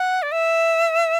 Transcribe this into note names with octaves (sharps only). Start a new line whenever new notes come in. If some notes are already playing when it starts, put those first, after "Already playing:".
Already playing: F#5
D5
E5